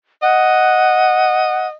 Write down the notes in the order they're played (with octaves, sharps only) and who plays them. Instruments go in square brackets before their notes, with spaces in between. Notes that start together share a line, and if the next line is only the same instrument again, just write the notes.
[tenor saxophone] D#5 [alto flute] F#5